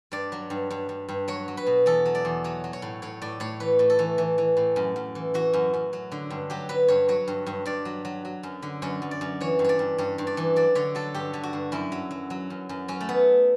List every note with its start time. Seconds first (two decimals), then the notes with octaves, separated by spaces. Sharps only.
0.12 G2 D5
0.32 F#3
0.50 G2
0.70 G2
0.89 G2
1.09 G2
1.28 F#3 C#5
1.48 F#3
1.57 B4
1.66 B2
1.86 E2 A4
2.05 F#3
2.15 D5
2.25 E2
2.44 F#3 C#5
2.64 F#3
2.73 C#5
2.82 A2
3.02 A2 C#5
3.22 A2 D5
3.40 A2 C#5
3.60 E3 B4
3.79 A2
3.90 A4
3.99 E3
4.18 E3
4.38 E3
4.57 A2
4.76 F#2
4.96 F#2
5.15 E3
5.34 E3 F#4
5.53 F#2
5.74 F#2
5.93 F#3
6.12 D3
6.30 G2
6.50 F#3 G4
6.69 F#3 B4
6.88 G2 C#5
7.08 F#3 C#5
7.28 G2
7.46 G2
7.66 G2 D5
7.85 F#3
8.05 F#3
8.25 F#3
8.43 F#2
8.62 D3
8.82 F#2 C#5
9.02 F#2
9.11 D5
9.21 F#2
9.41 E3 C#5
9.59 G2
9.64 C#5 D5
9.79 G2
9.98 G2 C#5
10.18 G2
10.27 D5
10.37 E3
10.56 F#3 D5
10.75 D3 C#5
10.95 F#3 A4
11.14 G2 G4
11.33 D3
11.43 F#4
11.53 G2
11.72 F#2 E4
11.92 F#3
12.11 F#3
12.30 F#3
12.50 F#2
12.69 F#2
12.88 F#3 C#4
13.00 A3
13.09 B3